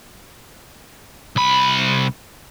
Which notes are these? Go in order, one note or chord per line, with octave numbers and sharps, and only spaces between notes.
C2 B5